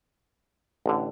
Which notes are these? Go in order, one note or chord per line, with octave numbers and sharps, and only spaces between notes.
A1 D3